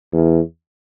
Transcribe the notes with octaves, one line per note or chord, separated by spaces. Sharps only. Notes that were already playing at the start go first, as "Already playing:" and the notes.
E2